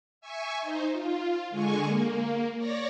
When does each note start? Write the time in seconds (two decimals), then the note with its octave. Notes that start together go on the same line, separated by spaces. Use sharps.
0.21 E5 G#5 C#6
0.61 D#4 C5
0.92 F4
1.50 D3 G#3 G#5 C#6
1.85 A#3
2.57 C#5 D5 A#6